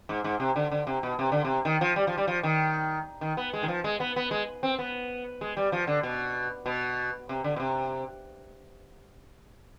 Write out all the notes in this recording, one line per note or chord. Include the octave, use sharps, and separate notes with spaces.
G#2
G#2
C3
D3
D3
C3
B2
C3
D3
C3
D#3
F3
G3
F3
G3
F3
D#3
D#3
B3
G#3
D#3
F3
G#3
B3
B3
G#3
C4
B3
G#3
G3
F3
D3
B2
B2
C3
D3
B2
C3